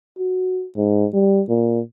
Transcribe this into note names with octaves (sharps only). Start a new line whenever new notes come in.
F#4
G#2
G3
A#2